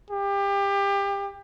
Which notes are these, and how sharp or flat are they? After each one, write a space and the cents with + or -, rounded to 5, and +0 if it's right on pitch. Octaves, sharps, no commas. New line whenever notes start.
G4 +25